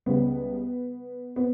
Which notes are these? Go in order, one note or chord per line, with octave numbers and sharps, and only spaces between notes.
C#2 C#3 G3 B3
B3